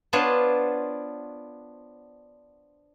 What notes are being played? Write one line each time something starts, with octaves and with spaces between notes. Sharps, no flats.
B3 D4 F4 C5 C#5